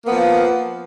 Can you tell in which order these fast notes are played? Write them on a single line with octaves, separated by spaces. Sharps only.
A#3 B3 F3